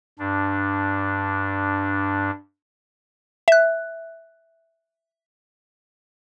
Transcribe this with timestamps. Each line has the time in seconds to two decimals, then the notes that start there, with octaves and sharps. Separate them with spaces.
0.19 G2 D4
3.48 E5 F#6